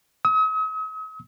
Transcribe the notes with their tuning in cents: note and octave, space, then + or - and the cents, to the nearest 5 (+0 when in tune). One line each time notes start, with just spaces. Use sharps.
D#6 +45